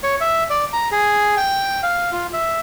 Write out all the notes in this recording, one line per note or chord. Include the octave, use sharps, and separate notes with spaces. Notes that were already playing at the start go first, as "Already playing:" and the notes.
C#5
E5
D5
A#5
G#4
G5
F5
F4
E5